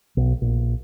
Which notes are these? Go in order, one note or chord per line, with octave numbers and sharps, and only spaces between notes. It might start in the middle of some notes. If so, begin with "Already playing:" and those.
B1
A#1